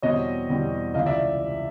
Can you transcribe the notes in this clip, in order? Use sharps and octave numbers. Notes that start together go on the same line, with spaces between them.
E2 B2 G3 C4 C#5 D#5
E2 B2 G3 C4
C#2 C3 E3 D#5 F5
D5 E5